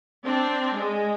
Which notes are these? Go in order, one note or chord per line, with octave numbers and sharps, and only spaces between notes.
C4 D4
G#3